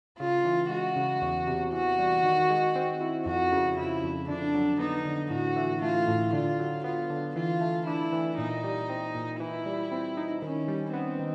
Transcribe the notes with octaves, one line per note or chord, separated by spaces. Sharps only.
C#3 F4
E3
G#3 F#4
C#3
E2
C3
E3 F#4
G3
D#3
G#3
C4
E4
F2 F#4
C#3
F3 E4
F2
D3 D4
F#3
B3 D#4
D3
A2 F#4
E3
A3 F4
A2
D3 F4
F#3
B3 F4
D3
E3 F4
A3
D4 E4
E3
A#2 D#4
G3
C4
A#2
E3 E4
G3
C4
D#4
D#3 C#4
G3
B3 C4
D#3